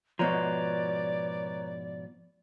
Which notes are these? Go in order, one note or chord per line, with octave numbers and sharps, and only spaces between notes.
G#2 B2 F3 B4 C#5 D5 A#5